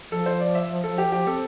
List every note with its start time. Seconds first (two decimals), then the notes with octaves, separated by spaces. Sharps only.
0.12 F3 A4
0.26 C5
0.40 D5
0.55 E5
0.84 A4
0.98 G4
1.12 G4
1.27 C4 A4